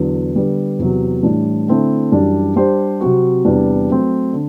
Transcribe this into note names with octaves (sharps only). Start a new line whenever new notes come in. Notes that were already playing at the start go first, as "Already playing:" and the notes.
Already playing: E2 D3 F#3
D3 G3 B3
E2 C3 F#3
A2 E3 G3 D4
D3 A3 C4 E4 A4
F#2 E3 G3 D4
G3 D4 G4 C5
C3 F#3 C4 F#4
E2 C3 E3 G3 D4
F#3 A3 C4
D3